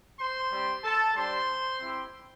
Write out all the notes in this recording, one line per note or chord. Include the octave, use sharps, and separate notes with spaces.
C5 C6
G3 C4 G4
A4 A5
G3 D4 G4 C5 C6
C4 E4 G4